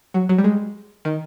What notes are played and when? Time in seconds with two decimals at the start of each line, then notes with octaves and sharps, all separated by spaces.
0.14 F#3
0.29 F#3
0.38 G3
0.44 G#3
1.05 D#3